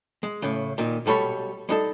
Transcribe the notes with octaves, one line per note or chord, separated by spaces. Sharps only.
G#3
A2 C#3
A#2 D#3
B1 G3 A4 C#5 B5
G3 D#4 A4